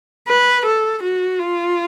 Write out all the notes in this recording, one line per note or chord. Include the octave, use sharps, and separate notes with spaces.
B4
A4
F#4
F4